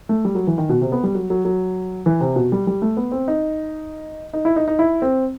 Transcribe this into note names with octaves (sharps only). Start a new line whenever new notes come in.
A3
G3
F#3
E3
D#3
B2
C3
B3
G3
F#3
F#3
F#3
E3
C3
B2
G3
G3
A3
B3
C4
D#4
D#4
E4
D#4
D#4
E4
C4